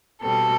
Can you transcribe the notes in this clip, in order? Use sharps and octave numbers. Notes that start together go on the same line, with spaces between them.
B2 G3 C4 A4